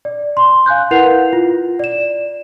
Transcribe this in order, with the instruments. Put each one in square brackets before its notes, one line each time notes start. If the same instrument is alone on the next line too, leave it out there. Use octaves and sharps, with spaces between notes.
[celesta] D5
C6
F5 G#5 F#6 G6
E4 A#4 B4 F#5 C7 F7
F4
D5 E7